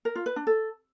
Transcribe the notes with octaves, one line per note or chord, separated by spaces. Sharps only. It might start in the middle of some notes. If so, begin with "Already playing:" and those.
A#4
F4
B4
D4
A4